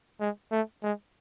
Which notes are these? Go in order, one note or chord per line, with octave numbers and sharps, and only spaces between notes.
G#3
A3
G#3